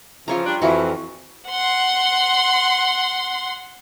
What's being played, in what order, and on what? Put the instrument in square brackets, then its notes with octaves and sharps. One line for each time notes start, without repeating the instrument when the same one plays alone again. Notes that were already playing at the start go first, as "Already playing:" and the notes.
[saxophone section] C#3 E3 F3 [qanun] F4 C#5 A#5
[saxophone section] G3 D4
[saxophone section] F2 [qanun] E3 F#4
[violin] F#5 C6